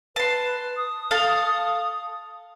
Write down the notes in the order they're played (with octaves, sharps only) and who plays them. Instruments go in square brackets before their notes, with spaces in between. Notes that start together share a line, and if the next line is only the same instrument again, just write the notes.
[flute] B4 [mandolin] A5 C6
[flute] D#6
[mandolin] A4 F5